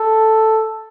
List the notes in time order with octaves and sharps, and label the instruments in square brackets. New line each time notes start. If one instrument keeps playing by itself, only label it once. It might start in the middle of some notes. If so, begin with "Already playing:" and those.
Already playing: [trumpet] A4